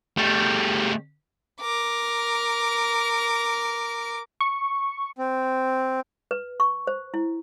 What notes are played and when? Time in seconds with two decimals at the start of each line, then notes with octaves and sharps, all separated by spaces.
0.17 G3 A3
1.61 A#4 D6
4.41 C#6
5.17 C4
6.31 B4
6.60 C#6
6.87 C5
7.14 E4